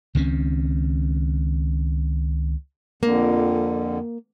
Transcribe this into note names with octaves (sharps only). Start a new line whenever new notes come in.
C#2 D#3 C4 C#4
F2 D3 A#3